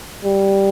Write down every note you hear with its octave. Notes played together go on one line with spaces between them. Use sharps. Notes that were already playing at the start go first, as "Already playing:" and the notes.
G3